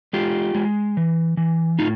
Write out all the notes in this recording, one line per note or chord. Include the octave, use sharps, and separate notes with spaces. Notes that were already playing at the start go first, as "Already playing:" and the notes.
G#3 F4 G4
G#3
E3
E3
A2 D#4 F4